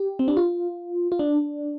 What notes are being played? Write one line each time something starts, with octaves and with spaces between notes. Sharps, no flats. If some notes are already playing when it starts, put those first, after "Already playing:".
Already playing: G4
C4
D4
F4
F4
D4